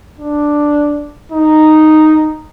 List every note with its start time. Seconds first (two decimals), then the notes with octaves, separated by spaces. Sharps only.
0.20 D4
1.32 D#4